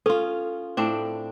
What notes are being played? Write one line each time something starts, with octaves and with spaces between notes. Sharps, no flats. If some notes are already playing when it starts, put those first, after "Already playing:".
C#4 F4 A4
A2 C4 D4